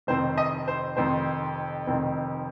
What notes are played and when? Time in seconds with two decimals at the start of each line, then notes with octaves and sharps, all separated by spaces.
0.07 F1 F2 D#3 C4 C5
0.38 D#5
0.68 C5
0.97 F1 F2 D#3 C4 C5
1.87 F1 F2 D#3 C4